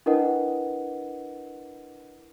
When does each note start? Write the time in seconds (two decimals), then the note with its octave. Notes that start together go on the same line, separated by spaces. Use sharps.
0.06 D4 E4 A#4 B4 D#5 F#5